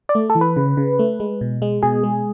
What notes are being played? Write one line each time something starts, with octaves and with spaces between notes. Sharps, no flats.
D5
A3
A4
E3
B4
C#3
C#3
A3
G#3
B2
G#3
B2 G#4
G#3